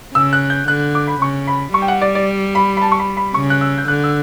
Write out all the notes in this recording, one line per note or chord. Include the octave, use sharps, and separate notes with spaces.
C#3 E6
F#6
G6
D3 F#6
D6
B5
C#3 C#6
B5
G3 C#6
G5
F#5
D5
D5
B5
B5
A5
C#6
B5
B5
C#3 C#6
F#6
E6
G6
D3 F#6
E6